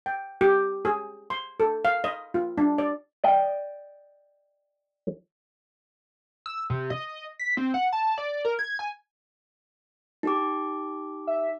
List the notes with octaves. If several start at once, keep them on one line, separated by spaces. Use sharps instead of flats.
G5
G4
G#4
C6
A4
F5
D#5
F4
D4
D5
D5 D#5 G5
E6
C3
D#5
B6
C4
F#5
A5
D5
A#4
G#6
G#5
D#4 G4 D6
E5